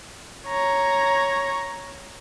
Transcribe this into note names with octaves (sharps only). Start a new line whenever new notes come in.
C#5 A#5